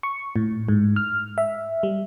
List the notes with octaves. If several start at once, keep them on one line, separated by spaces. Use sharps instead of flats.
C#6
A2
G#2
F6
E5
G3